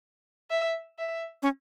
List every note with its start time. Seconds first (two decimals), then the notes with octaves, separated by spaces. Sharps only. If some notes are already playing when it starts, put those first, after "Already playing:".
0.50 E5
0.99 E5
1.42 C#4